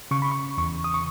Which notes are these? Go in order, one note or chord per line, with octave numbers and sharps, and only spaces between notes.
C#3 C#6
B5
C#6
E2 C#6
D#6
C#6